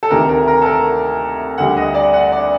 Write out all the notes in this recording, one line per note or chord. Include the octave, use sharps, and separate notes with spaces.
A4
D2 C3 D#3 A3 A#4
A#4
A#4
A4
A#4
D2 D3 G3 F#5
D#5
D5
F#5
D5